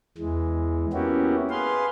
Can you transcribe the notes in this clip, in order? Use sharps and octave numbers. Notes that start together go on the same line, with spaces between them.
E2 E3 G#3
A#3 B3 C#4 E4 F#4 G4
G#4 B4 F5 C6